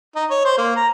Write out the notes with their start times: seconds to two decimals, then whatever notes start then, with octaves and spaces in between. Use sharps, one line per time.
0.16 D#4
0.30 C#5
0.45 C5
0.58 A#3
0.76 A#5